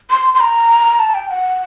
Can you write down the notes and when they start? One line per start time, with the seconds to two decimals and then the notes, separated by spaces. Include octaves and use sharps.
0.11 C6
0.34 C6
0.41 A#5
1.00 A5
1.14 G5
1.30 F#5